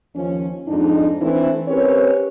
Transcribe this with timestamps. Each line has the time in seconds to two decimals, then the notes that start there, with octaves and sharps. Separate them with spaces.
0.15 D#2 F3 C#4
0.67 F2 G#2 D4 D#4
1.21 E3 A3 C4 D4 E4
1.68 C4 C#4 G4 A#4 B4 C#5